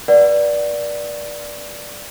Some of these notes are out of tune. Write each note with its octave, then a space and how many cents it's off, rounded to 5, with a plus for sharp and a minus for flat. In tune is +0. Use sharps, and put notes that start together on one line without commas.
B4 -35 D5 +0 F#5 +0